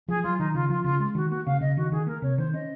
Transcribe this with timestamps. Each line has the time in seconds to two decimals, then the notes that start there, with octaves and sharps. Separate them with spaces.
0.08 F3 G#4
0.23 F#3 F4
0.39 D#3 D#4
0.54 C#3 F4
0.70 F3 F4
0.84 C#3 F4
1.00 G#3
1.15 D#3 F#4
1.30 A#3 F#4
1.46 C#3 F5
1.61 C#3 D#5
1.77 D#3 F#4
1.92 D#3 G#4
2.07 A#3 A#4
2.22 C3 C#5
2.38 D#3 C5
2.54 C#4 D#5